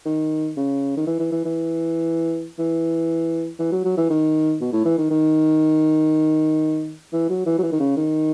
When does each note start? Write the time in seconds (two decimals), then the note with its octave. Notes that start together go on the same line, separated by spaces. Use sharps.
0.05 D#3
0.57 C#3
0.97 D#3
1.07 E3
1.19 E3
1.31 E3
1.45 E3
2.58 E3
3.59 E3
3.71 F#3
3.84 F#3
3.97 E3
4.10 D#3
4.61 B2
4.73 A2
4.85 E3
4.98 D#3
5.10 D#3
7.13 E3
7.29 F#3
7.46 E3
7.58 F#3
7.63 E3
7.72 D#3
7.79 C#3
7.97 D#3